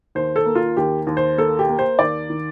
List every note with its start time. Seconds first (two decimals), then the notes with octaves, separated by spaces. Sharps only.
0.15 D#2 C5
0.36 A4
0.46 A#3
0.55 F4
0.77 D#2 G4
1.07 D#2
1.17 C5
1.37 A#3 A4
1.59 G4
1.69 A#3
1.79 C5
1.99 D#2 D5
2.30 D#3